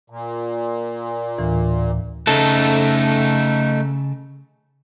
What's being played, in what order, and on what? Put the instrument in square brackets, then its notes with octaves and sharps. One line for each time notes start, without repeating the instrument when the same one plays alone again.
[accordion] A#2
[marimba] D2 A2 E3
[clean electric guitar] C#3 A4 [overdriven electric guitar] A3 D#4